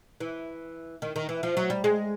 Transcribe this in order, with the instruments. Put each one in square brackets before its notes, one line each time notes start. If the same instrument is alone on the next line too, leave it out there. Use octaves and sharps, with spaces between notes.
[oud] E3
D#3
D#3
E3
F3
F#3
G3
G#3